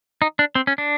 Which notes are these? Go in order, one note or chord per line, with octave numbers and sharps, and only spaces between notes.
D#4
D4
C4
C#4
D4